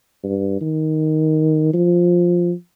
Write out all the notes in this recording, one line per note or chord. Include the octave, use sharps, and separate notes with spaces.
G2
D#3
F3